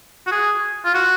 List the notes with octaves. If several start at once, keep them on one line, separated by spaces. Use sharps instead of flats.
F#4
G#4
F4
F#4